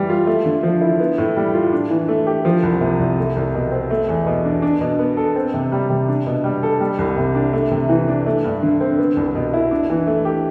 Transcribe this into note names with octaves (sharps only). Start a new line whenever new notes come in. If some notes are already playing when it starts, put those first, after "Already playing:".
Already playing: E3 G3
F4
A3
D3
F3
E4
B3
A2
G3
F4
D4
E3
A3
G4
F3
C2
C3
C2
A3
C2
B2
C4
A3
E2
B2
D4
D4
B2
B3
A4
C4
C3
G3
C3
D4
B2
G3
A4
G3
C2
C3
D4
A3
C3
E3
D4
A3
G2
D3
C4
B3
C2
B2
E4
D4
E3
A3
G4